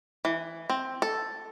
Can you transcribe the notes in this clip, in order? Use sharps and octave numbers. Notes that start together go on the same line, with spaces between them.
E3
C4
A4